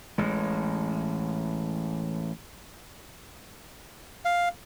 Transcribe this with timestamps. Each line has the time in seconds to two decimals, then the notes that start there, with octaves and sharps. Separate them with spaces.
0.18 A1 G#3
4.25 F5